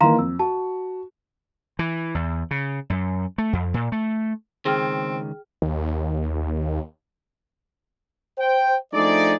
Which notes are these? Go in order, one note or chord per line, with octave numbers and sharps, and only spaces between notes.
D#3 E3 A#3 F5 A#5 C6
F2 E6
F#4 A5
E3
E2
C#3
F#2
A3
F2
A#2
A3
C#2 D#3 C4 G#4 G5 F6
D#2
C5 G5
F3 A3 D4 D#4 G#4 D5